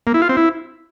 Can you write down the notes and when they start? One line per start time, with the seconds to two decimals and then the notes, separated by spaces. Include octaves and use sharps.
0.07 A#3
0.14 E4
0.22 F4
0.29 C4
0.37 E4